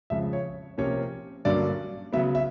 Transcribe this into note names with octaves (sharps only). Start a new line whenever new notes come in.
F2 C#3 F3 G#3 E5
C#5
C3 F3 A#3 C#4 C#5
G2 D3 F#3 A#3 C#4 D5
C#3 F#3 B3 E5
E5